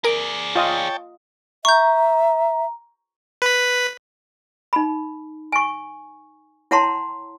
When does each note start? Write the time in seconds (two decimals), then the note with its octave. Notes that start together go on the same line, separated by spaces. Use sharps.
0.04 G#4 A#4 D5 D7
0.55 F4 C#5 D#5 G5 A5
1.65 E5 A#5 C#6 G6
3.42 B4 B5
4.73 D#4 B5
5.52 G#5 C#6
6.71 E4 C#5 F#5 A5 A#5 C6